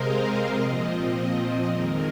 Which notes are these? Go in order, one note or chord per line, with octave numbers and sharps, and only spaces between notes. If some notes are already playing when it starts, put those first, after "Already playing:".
Already playing: C3 G#3 C4 A#4 D#5 F5
F5
A#2 F3 C4 D#5
D#5
F2 D#3 G#3 A#4